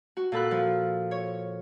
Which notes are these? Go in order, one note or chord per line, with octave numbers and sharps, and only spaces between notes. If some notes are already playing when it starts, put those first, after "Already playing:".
F#4
A#2 A4 B5 F#6
F3
C#5